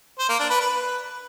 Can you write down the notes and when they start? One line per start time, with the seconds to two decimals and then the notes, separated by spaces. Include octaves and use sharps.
0.19 C5
0.29 A#3
0.39 D4
0.50 B4
0.60 B4